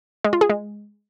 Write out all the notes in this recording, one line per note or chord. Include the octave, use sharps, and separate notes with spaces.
G#3
F4
G#4
G#3